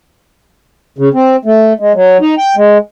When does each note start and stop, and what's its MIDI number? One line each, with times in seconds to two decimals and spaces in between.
0.98 1.09 49
1.14 1.36 60
1.45 1.73 57
1.80 1.93 56
1.95 2.17 54
2.21 2.35 63
2.38 2.55 79
2.57 2.78 56